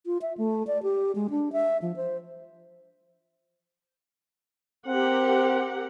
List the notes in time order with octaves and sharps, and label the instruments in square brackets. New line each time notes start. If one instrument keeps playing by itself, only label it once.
[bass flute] F4
E5
A3
D5
G4
G#3
D4
E5
F3
C5
[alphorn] C4 [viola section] G4 A#4 F#5